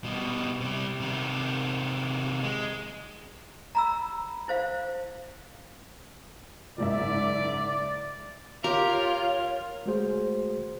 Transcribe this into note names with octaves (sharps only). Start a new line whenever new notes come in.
B2 G3
C3 G3
C3 D#3
G#3
A#5 B5 E6
E4 C5 F5
F#1 G#2 D5 E5
F4 G4 A#4 C#5
G#3 A3 F#4 G#4 C5